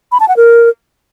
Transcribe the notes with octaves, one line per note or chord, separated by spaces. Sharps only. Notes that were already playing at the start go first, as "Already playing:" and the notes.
B5
A5
F#5
A#4